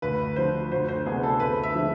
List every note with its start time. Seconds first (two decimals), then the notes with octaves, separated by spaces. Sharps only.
0.02 D2 B4
0.36 D3 F3 C5
0.71 D2 C5
0.88 C5
1.06 C3 E3 B3 D4 G#4
1.23 A4
1.40 D2 B4
1.63 E5
1.74 D3 F3 G#3